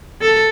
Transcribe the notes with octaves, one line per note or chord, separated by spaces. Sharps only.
A4